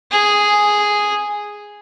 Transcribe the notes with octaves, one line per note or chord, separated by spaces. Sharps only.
G#4